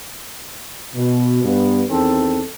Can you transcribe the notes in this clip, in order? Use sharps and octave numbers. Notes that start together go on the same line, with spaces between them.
B2
G2 B3
E2 D#3 C4 A4